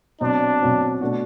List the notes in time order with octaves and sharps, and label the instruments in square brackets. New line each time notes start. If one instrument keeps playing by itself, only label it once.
[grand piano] B2 F#3 C4 [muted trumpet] D4
[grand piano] B2 F#3 C4
B2 A3 D4 F#4